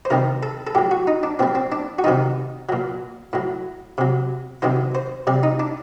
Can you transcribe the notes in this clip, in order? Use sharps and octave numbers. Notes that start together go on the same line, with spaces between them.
C5
C3 D#3 G3 A#4
A4
A4
A2 F#3 G4
F#4
D#4
D4
A#2 G3 C4
C4
D4
F#4
C3 D#3 G3 D#4
A#2 F#3
A2 F#3
C3 F#3
C3 D#3 F#3 C5
C5
C3 G3 D5
D#4
D4